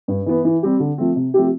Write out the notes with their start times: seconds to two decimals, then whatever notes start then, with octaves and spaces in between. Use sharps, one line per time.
0.08 G2
0.26 E3 B3
0.45 E3
0.63 G3 C4 G4
0.80 D3
0.98 F3 A3 C4
1.16 C3
1.34 F3 A3 C4 G4